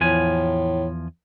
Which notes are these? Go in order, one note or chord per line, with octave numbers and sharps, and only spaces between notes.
E2 A2 F3 G#5